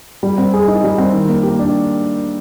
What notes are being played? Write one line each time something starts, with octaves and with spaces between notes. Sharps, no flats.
G3
C4
G#4
D#4
G3
C4
D#3
A#3
G4
D4